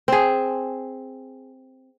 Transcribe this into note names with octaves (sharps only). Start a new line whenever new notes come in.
C4 G#4